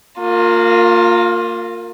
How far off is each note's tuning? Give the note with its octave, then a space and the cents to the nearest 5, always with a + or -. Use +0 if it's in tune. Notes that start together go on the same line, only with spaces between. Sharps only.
A#3 -20 F4 +20